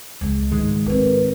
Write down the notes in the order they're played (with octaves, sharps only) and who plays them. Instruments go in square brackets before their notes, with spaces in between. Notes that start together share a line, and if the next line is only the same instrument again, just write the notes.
[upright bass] C#2 G#3
[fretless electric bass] G#2 D#3 G#3 [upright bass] E3
[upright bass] B3 C4 [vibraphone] A#4 B4